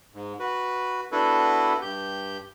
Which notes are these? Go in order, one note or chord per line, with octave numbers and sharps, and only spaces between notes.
G#2
F#4 B4
B3 D4 E4 F#4 A4 B4
G2 G4 G6